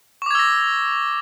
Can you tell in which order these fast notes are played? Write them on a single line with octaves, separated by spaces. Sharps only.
C#6 D6 G#6 E6 A#6